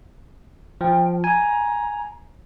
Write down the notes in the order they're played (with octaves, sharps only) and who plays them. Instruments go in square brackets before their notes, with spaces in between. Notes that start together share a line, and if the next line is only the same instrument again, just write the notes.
[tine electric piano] F3 [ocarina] G5
[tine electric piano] G#5 [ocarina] A#5